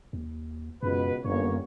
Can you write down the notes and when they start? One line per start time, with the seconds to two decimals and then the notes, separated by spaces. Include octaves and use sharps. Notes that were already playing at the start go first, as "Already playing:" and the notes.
0.13 D#2
0.83 C#2 F#2 B2 B4
1.25 G1 F#2 A#3 C#5